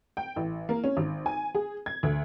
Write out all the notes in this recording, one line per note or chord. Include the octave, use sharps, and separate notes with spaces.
G5
A1
A#3
C#4
G#1
G#5
G#4
G#6
D2